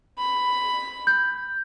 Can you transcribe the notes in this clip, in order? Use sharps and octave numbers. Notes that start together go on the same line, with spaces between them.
B5
G6